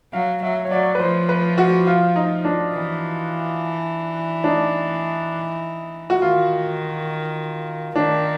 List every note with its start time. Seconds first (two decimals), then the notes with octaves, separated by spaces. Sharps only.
0.13 F#3 F5
0.42 F#3 E5
0.65 C#5
0.71 F#3 D5
0.95 B4
0.99 F3 C5
1.29 B4
1.58 F#4
1.87 F4
2.16 D#4
2.45 D4
2.74 E3
4.44 D4
4.48 D#4
6.10 F#4
6.22 D#3 F4
7.96 D#3 D4